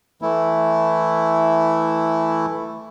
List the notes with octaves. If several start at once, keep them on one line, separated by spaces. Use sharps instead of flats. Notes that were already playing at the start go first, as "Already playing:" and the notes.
E3 A3 E4